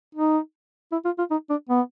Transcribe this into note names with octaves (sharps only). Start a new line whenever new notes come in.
D#4
E4
F4
F4
D#4
D4
B3